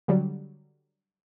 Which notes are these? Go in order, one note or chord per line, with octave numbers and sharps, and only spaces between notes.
D3 F#3 G3